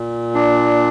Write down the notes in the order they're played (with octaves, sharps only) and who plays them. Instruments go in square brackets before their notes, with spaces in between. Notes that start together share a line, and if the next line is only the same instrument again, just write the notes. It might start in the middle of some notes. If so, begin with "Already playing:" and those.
Already playing: [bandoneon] A#2
D4